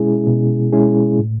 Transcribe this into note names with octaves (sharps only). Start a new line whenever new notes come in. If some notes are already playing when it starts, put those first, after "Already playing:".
Already playing: B2 G#3 C#4 E4 G#4
B2
G#3 C#4 E4 G#4
A2